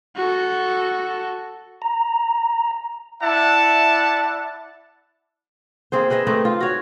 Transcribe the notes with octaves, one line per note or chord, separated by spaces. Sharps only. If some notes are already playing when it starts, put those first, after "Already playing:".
F#4 A4
A#5
E4 D5 E5 F#5 A5
A#3 C4 G#4 C5
G#4 B4 D#5 E5
A3 C4 D#4 B4
F4
F#4 C#5